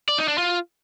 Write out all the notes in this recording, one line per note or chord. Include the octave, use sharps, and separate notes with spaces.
D5
D#4
D4
F4